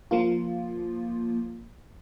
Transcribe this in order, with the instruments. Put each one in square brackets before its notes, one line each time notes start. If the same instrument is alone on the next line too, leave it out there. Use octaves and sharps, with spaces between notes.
[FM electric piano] F3 A#3 F4